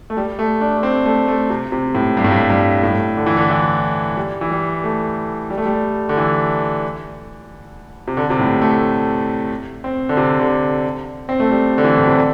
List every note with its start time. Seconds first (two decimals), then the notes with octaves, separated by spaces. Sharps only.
0.10 A3
0.17 G3
0.39 A3
0.61 D4
0.77 A3
0.83 C4
1.05 A3
1.28 A3
1.50 C3
1.72 C3
1.95 A2
2.17 G2
2.24 A2
2.32 G2
2.50 G2
2.83 A2
3.17 D3
3.26 E3
3.37 D3
3.50 E3
4.17 G3
4.41 E3
4.50 G3
4.84 A3
5.50 G3
5.58 A3
5.65 G3
6.09 D3
6.17 E3
8.08 C3
8.17 D3
8.30 C3
8.39 A2
8.62 A3
9.84 C4
10.09 D3
10.17 C3
10.39 D3
11.29 C4
11.40 A3
11.51 G3
11.78 D3
11.84 E3
11.98 A2
12.07 C3
12.17 D3